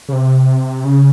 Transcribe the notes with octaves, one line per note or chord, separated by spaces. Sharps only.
C#3
C3
C#3